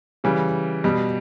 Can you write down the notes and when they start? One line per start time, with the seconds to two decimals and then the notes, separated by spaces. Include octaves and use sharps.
0.24 C#3 E3 G3
0.84 B2 G3